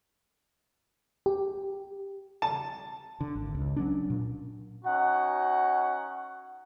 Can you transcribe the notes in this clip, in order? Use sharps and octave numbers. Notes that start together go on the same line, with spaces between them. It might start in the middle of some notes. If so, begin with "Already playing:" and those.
G4
A5
D3
G#1
C#2
F#3 C#4 D4
A#2
C#4 D#4 F#4 F#5